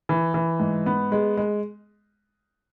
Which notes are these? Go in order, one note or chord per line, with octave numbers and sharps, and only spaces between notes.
E3
E3
G#2
B3
G#3
G#3